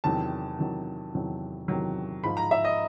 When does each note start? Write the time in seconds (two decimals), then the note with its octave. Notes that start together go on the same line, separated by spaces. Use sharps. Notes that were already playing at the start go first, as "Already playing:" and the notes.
0.04 E2 C3 D#3 F#3 A5
0.58 E2 C3 D#3 F#3
1.15 E2 C3 D#3 F#3
1.68 E2 C3 D#3 F#3
2.24 G#2 F3 B5
2.37 A#5
2.51 E5
2.65 D#5